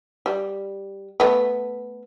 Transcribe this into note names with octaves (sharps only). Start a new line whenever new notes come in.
G3
A3 B3